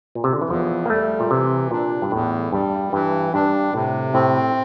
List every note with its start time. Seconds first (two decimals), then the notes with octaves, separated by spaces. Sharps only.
0.15 A#2
0.24 C3
0.33 D3
0.41 E3
0.49 E2 F3
0.86 A#3
0.90 G3 A3
1.20 A#2
1.31 C3 E3
1.71 A#2 D4
2.02 G2
2.12 E2 A2
2.53 G2 G3
2.93 G2 E3
3.34 G2 D4
3.74 A2 C3
4.14 A2 C4